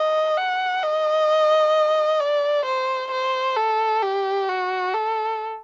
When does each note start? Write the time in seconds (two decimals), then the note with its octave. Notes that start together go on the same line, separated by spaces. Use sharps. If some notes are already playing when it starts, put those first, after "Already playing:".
Already playing: D#5
0.37 F#5
0.82 D#5
2.20 D5
2.65 C5
3.11 C5
3.56 A4
4.03 G4
4.49 F#4
4.94 A4